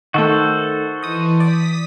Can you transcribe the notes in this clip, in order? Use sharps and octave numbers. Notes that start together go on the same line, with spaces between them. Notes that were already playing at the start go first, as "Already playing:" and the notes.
D#3 A3 F#4 A4 C5
E3 D#5 D#6
D5 D#6 B6